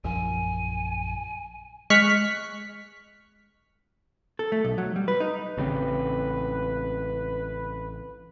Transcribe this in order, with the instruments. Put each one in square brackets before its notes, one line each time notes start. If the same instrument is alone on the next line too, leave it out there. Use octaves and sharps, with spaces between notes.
[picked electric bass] A#1 F#2 F3 [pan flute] G#5
[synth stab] G#3 C#6 F6 F#6 B6
[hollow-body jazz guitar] A4
A3
B1
F#3
G3
B4
D#4
[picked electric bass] A1 C#3 C4 [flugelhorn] B4